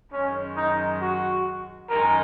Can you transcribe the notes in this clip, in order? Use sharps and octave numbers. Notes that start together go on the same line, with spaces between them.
F#2 D#3 G#3 C#4
D#4
F#4
F#2 D#3 G#3 D#4 A#4